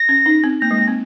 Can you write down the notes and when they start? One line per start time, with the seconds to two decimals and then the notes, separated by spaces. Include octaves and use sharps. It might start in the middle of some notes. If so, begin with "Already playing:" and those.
Already playing: A#6
0.09 C#4
0.26 D#4
0.44 C4
0.61 A#3 A#6
0.71 G#3
0.79 A#3
0.88 C4